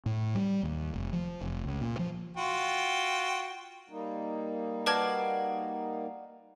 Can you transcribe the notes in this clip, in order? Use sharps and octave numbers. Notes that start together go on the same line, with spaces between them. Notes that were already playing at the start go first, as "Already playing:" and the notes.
A2
G3
D#2
F1
F3
F1
C#2
A#2
F3
F4 F#4 G5
G3 A#3 D#4
F#4 B4 D5 F5 A5 G#6